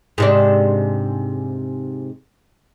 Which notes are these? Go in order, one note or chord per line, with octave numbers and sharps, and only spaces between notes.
G#2 C3 D4